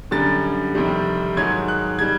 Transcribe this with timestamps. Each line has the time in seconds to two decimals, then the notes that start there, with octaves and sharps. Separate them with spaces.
0.11 F#2 D3 G3 A6
0.75 F2 C3 D#3 G3
1.36 G#2 D#3 F#3 G#6
1.68 F#6
1.99 D#3 G3 G#6